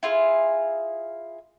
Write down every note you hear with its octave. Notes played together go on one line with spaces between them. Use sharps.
E4 F4 G#4